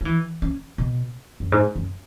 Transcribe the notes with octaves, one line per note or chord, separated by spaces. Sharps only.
F#3
E3
C#4
B2
F#2
G#2
F#2